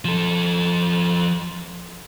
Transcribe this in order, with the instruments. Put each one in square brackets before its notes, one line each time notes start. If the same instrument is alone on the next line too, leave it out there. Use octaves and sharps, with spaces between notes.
[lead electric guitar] F3 A4